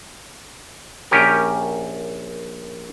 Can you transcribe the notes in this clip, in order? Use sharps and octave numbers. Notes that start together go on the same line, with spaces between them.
A#1 C#4 G4 A#4